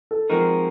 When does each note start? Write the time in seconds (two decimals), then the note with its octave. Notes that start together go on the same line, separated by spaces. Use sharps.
0.11 A4
0.30 F3 G#3 C4 D#4 F#4 A#4